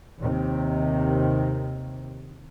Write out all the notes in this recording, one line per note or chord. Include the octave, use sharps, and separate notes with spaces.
D#2 C3 D#3